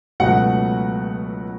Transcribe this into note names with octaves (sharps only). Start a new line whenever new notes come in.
C#2 B2 F#3 A3 F#5